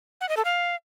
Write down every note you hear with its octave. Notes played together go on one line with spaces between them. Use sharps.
F#5
D#5
A4
F5